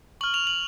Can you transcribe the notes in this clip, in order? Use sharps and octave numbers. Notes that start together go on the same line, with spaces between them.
C#6 F6 F#7
F7
F#7